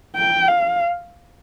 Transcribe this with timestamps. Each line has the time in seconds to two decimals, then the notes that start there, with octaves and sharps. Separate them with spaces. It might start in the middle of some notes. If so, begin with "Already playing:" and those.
0.16 G5
0.48 F5